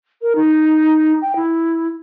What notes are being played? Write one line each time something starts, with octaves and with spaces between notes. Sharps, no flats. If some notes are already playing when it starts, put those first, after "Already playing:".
A#4
D#4
G5
E4